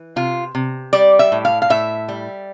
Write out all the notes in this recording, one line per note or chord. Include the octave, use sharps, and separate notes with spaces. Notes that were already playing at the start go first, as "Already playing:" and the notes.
Already playing: E3
C3 F4
C3
G3 D5
E5
A2
F5
F5
A2 E5
G3